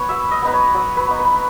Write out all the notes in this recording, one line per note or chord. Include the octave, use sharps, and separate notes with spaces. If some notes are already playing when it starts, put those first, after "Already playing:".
Already playing: B3 B4 C#5
F#3 E5
D#5
B3 D#4 B4
C#5
F#3 C#5
B4
B3 D#4
B4